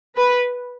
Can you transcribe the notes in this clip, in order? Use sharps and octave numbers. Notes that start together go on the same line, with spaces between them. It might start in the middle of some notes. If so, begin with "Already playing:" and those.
B4